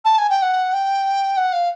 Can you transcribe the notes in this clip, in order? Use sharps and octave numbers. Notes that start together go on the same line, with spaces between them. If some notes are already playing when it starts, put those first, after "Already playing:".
A5
G#5
G5
F#5
G5
F#5
F5